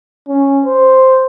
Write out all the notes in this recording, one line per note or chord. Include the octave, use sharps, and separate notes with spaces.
C#4
C5